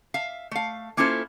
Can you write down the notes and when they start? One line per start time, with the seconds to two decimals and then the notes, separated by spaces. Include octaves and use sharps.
0.14 E5 F5
0.51 A3 F5
0.97 A#3 C#4 E4 F4 A4 C5